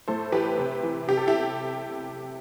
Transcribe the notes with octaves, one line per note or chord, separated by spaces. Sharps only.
A2 A4 C5
E3 G4 B4
C3
E3
C3 G4
A4
E4 G4